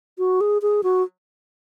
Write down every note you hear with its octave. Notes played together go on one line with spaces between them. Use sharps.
F#4
G#4
G#4
F#4